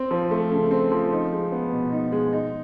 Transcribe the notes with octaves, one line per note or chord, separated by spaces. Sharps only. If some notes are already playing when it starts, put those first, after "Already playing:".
Already playing: C4
F3
A3
C#3
C4
F3
D#4
G#3
B3
B2
D#4
G#3
D#4